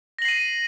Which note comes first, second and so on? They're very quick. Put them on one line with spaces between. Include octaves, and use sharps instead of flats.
A#6 F#7 C7 D#7